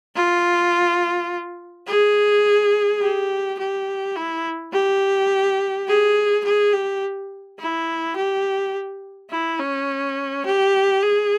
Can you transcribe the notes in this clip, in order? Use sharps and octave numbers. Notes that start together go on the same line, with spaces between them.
F4
G#4
G4
G4
E4
G4
G#4
G#4
G4
E4
G4
E4
C#4
G4
G#4